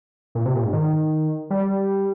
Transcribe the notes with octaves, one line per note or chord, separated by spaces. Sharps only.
A#2
C3
A#2
G#2
D#3
G3